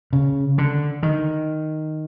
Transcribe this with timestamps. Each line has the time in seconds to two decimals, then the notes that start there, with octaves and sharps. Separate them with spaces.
0.13 C#3
0.58 D3
1.03 D#3